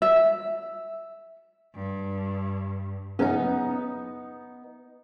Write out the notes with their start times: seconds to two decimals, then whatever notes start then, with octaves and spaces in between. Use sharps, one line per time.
0.02 E5
1.75 G2
3.19 F#2 C#3 B3 D#4